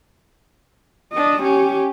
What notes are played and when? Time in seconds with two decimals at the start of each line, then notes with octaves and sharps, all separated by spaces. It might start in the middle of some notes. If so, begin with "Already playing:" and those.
1.12 D4 D#5
1.43 C#4 G4